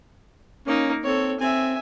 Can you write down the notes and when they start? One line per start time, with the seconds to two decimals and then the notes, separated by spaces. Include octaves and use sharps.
0.66 A#3 C#4 D#4
1.04 C4 A4 C#5
1.40 C4 E5 G#5